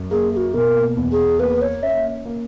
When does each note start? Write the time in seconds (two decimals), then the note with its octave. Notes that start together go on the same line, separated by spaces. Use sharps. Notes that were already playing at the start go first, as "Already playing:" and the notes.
Already playing: F#2
0.11 A#3 G#4
0.32 G#4
0.37 F#4
0.54 B2 A#4
0.97 E2
1.12 G#4
1.40 A#3 B4
1.62 C#5
1.83 C#4 E5
2.26 A#3